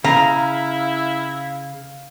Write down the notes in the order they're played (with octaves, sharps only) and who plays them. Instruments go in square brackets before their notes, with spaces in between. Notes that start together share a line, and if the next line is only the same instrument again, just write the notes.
[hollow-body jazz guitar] C#3 [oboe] E4 [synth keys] F5 [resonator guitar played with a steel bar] A#5